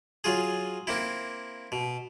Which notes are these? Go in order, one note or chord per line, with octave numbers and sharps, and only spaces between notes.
F#3 F4 G#4
A#3 C4 E4
B2